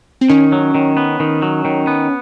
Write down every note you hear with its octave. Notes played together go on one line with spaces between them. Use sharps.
C4
D#3 C#4
F#3
D#3
B3
D#3
F#3
D#3
B3